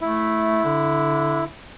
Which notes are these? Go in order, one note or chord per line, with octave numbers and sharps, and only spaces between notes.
A3 E4
D3